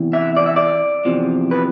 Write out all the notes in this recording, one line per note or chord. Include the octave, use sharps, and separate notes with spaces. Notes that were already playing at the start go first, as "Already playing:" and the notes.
Already playing: E2 C3 E3
E5
D5
E5
D5
E2 C3 F3
B4